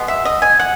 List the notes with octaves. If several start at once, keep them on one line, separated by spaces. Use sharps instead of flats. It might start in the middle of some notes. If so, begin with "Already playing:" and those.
Already playing: B2 G#3 B3
E5
D#5
G#5
F#5